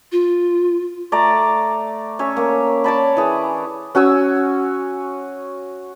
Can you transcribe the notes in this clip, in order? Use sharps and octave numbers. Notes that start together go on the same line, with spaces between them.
F4
A3 D5 A#5
C#4 C#5 E5
A#3
C#5 D5 A5 B5
E3 G#4
C#4 F#4 G#5 E6